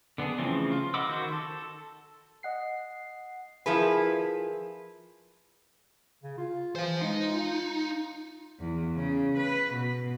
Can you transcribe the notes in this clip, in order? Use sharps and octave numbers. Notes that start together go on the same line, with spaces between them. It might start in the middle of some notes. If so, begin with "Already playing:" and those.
D3 B3 D4 G#4
C#3 E3 F3 A3 C4
F4
D#5 F#5 B5 D6 E6
D#3 F#4 C5
A4
D#5 F#5 C7
F3 E4 G#4 A#4 B4
C#3
F4
E3 C5 F5
G#3 D#4
F4
E2
C#3
B4
B2